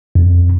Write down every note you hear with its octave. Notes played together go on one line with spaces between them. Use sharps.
F2